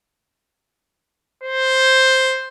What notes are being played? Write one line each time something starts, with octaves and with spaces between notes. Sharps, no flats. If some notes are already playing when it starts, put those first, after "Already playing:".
C5